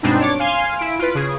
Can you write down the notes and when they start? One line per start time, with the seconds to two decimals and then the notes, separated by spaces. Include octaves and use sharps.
0.03 G2 B2 G#3 C4 D4 D#4
0.19 D4 C#5 D6
0.39 F5 G#5 C6
0.79 E4 D7
0.99 F4 B4
1.15 C#3 G#4